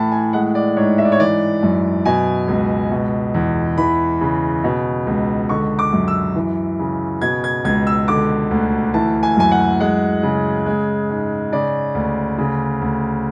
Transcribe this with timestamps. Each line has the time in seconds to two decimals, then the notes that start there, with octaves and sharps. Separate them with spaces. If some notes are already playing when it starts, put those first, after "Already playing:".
Already playing: A2 E3 A5 B5
0.12 G#5
0.33 G#3 F#5
0.55 D5
0.76 G#2 C#5
0.98 E5
1.05 D5
1.12 C#5
1.20 E3 D5
1.63 F#2
2.05 B2 G#5
2.48 C#2
2.91 B2
3.34 E2
3.78 E3 B5
4.21 C#3
4.64 B2
5.07 C#2
5.49 D3 C#6
5.79 D6
5.93 F#2
6.08 E6
6.36 E3
6.79 C#3
7.22 B2 G#6
7.44 G#6
7.65 C#2 G#6
7.87 E6
8.08 D3 D6
8.51 D2
8.94 E3 A5
9.23 G#5
9.37 F#2 G#5
9.51 F#5
9.80 G#3 F#5
10.23 C#3
10.66 G#3
11.09 G#2
11.52 C#3 D5
11.95 D2
12.38 C#3
12.82 D2